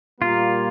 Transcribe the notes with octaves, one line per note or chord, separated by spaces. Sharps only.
A#2 G3 A#3 F4